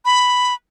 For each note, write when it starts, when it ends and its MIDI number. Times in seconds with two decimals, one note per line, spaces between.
0.05 0.54 83